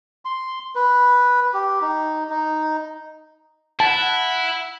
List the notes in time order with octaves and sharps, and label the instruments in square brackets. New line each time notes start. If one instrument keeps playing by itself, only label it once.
[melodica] C6
B4
G4
D#4
D#4
[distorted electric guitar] E4 [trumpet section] F#5 [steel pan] A5